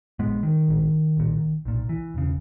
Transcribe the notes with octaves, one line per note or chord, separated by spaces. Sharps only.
A#1 G#2 G#3 B3
D#3
A#1 G#2
B1 A#2
B1 A#2
E3
E1 C#3